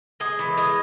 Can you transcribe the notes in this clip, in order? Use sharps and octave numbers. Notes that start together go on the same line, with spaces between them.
G#3 G#4
E3
G#3 G#4